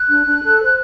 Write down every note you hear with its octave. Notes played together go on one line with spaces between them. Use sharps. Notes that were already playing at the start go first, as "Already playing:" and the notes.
Already playing: F#6
D4
D4
A4
C5